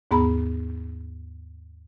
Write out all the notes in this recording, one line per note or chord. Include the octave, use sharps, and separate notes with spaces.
D#2 G#2 B3 G#4 A#5 B5